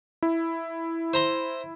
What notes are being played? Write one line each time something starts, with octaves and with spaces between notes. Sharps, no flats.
E4
C5 A#5 C6